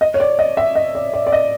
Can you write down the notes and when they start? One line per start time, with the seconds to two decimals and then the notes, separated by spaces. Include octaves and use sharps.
0.01 D#5
0.14 C#5
0.20 D5
0.39 D#5
0.57 E5
0.75 D#5
0.95 D5
1.13 D5
1.27 D5
1.32 D#5